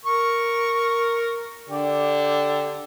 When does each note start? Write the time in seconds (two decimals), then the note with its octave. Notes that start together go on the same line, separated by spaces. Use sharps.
0.05 A#4 C#6
1.69 D3 G4 D5